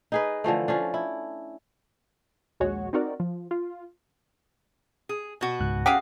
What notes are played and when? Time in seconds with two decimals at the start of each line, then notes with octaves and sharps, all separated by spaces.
0.12 D#4 G#4 B4
0.44 D3 E3 F3 A3
0.68 F3 C#4 D4
0.94 E4
2.60 A#1 D#2 G#3 F#4 C#5
2.93 C4 D#4 F#4 A#4 D5
3.20 F3
3.51 F4
5.09 G#4
5.41 B2 F#4
5.60 C#2 G#2 F#6
5.86 C#4 G4 G#4 F5 F#5